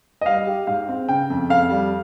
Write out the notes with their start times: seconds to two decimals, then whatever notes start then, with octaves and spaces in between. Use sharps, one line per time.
0.21 D#5
0.26 G3 F5
0.47 G4
0.67 G#2 F5
0.89 C4
1.08 C#3 G5
1.30 F2
1.49 F2 F5
1.70 G3